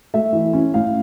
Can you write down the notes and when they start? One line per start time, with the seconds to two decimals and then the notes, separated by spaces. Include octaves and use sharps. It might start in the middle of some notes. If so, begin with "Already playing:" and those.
0.14 A3 E5
0.33 E3
0.53 C#4
0.74 A2 F5